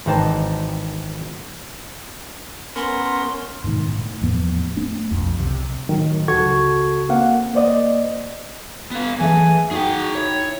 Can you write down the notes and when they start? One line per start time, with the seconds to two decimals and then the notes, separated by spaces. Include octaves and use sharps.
0.06 G#1 E3 C4 D#4 A5
2.76 B3 C#4 A#4 C6
3.64 G#2 B2 D#3
3.88 A2
4.22 E2 A2 F3 B3
4.77 A3 C4 D4
5.11 B1 F2
5.39 C2 C3
5.89 A2 D#3 F#3
6.28 C#2 C#3 F#4 A4 C#6 G#6
7.09 A#3 C4 F5 F#5
7.54 A#3 C5 D5 D#5
8.91 B3 F5
9.20 E3 A3 G#4 E5 G#5
9.71 D#4 F#4 G#4 G5
10.15 E4 C#5